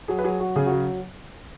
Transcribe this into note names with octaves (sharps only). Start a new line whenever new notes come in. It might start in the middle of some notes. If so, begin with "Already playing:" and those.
F#3 G#4
B4
F#3 G#4
F#3 F#4
C#3 G#4
F#4
F#3